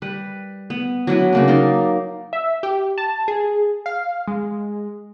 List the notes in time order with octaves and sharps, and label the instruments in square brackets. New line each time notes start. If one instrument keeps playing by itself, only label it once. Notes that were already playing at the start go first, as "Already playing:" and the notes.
[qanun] G3 B4
B3
F#3 D4 E4 B4
C#3 A#3 D4
D#4 A#4 D5 C6
[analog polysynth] E5
G4
A5
G#4
F5
G#3